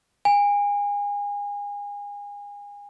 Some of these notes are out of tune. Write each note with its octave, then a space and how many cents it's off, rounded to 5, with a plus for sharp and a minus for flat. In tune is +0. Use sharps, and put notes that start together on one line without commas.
G#5 -30